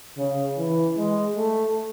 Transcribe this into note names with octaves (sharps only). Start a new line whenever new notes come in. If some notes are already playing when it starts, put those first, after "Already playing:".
C#3
E3
G#3
A3